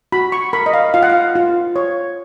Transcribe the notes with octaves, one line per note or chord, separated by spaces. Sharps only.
F#4 B5
C#6
A#4 B5
D#5
F5
F4 F5
F#5
F5
F4
C#5